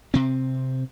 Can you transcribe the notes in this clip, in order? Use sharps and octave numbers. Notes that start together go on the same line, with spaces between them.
C3 C4